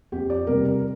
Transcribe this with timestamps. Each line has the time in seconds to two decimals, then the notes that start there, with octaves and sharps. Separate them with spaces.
0.12 F2 G4
0.30 D5
0.47 C3 G3 C4 A#4
0.65 A#4